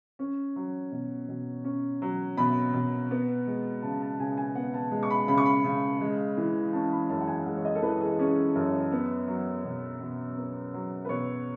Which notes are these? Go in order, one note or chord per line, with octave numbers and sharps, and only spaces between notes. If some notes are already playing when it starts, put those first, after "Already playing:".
C#4
F#3
B2
B2
C#4
F#3
B2 B5
B2
B3
G#3
C#3 A5
A5
C#3 G#5
G#5
B3 F#5
A5
G#3
C#6
B5
C#3 B5
C#6
B5
C#3
G#3
E3
C#4 A5
B5
F#2 A5
F#5
G#5
G#3 F#5
C#5
D#5
A4
E3 B4
G#4
C#4 G#4
F#2
B3
F#3
B2
B2
B3
F#3
B4
B2 C#5